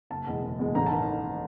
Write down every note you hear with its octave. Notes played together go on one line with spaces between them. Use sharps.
F#1 A5
E2 B2 G#3
F#1
E2 B2 G#3
A1 A#5
A5
D#3